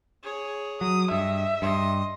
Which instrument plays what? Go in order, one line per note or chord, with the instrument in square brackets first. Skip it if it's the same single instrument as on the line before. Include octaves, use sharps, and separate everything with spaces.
[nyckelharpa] G#4 C#5
[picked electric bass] F#3 [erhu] D#6
[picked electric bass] G2 [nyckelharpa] D#5 [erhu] E5
[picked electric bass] G2 [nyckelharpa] D#5 C6